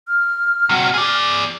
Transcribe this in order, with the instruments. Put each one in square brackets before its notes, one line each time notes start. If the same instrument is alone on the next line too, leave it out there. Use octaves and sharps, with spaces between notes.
[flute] F6
[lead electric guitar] C3 F#4
G#4 D5